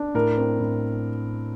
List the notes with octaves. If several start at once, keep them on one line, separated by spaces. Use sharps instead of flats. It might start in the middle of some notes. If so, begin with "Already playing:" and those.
Already playing: D4
A2 A#4
C4
A2